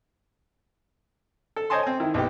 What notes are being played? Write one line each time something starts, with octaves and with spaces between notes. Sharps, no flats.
A4
C5 C#5 D#5 G#5 A5 C6
C4 G#5
D#3 E4
A#1 B3 D#4 G4